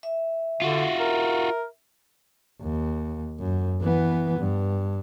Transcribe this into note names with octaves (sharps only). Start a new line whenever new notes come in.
E5
D3 F4 F#4
A#4
D#2
F#2
E3 B3
G2